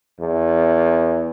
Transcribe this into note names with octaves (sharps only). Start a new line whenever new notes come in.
E2